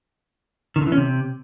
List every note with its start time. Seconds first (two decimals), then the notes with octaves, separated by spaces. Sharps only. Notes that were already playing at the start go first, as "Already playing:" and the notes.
0.76 D#3
0.81 D3
0.87 E3
0.92 C#4
0.97 C3